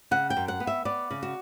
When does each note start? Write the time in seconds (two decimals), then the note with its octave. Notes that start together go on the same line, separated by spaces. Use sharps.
0.11 C#3 F#5
0.30 G5
0.37 F#2
0.48 F#5
0.60 B3
0.67 E5
0.85 B3 D5
1.11 C#3
1.23 F#4